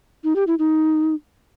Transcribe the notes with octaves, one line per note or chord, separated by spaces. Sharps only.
D#4
G4
E4
D#4